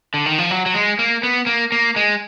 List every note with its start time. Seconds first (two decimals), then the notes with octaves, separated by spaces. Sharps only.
0.14 D3
0.26 D#3
0.38 F3
0.51 F#3
0.66 F#3
0.74 G#3
0.99 A#3
1.23 B3
1.46 A#3
1.72 A#3
1.96 G#3